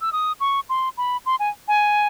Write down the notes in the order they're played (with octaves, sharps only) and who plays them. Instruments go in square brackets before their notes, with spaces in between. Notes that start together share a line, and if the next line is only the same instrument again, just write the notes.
[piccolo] E6
D#6
C#6
C6
B5
C6
G#5
G#5